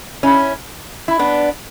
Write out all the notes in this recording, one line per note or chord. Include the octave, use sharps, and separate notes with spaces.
C#4 E4
E4
B3 D4